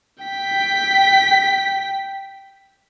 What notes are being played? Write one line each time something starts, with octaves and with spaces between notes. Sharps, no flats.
G5 B6